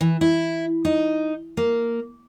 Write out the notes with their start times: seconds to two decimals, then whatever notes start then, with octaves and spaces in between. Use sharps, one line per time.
0.01 E3
0.21 E4
0.85 D#4
1.57 A#3